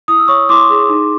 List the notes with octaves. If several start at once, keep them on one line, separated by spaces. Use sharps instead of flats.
E4 D#6
E6
C#5 C#6 D#6
E4 C6 D6
G#4
D#4